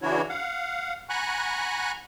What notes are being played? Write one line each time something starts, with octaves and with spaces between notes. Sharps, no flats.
C#3 E3 D4 E4 F#4 C#5
F5 F#5
F#5 G#5 A#5 B5 C#6 F#6